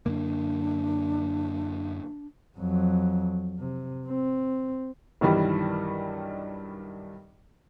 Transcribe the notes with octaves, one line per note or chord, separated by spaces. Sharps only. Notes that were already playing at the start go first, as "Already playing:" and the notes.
F#2 D3 A#3 D4
F2 F#3
C3
C4
B1 G2 D#3 E3 G3